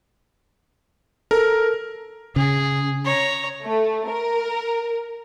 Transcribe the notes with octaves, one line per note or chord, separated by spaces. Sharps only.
A4 A#4
C#3 G#4
C#5 A#5
A3
A#4